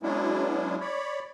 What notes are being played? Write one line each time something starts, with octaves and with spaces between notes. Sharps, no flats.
F#3 G#3 B3 C#4 D4 E4
C#5 D5 B5